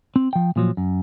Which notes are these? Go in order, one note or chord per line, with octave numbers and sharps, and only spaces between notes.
C4
F3 G5
A#2 F3 F#3
F#2